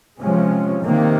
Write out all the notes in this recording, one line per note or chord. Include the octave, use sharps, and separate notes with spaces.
C3 F3 G#3 C#4
C3 D#3 A#3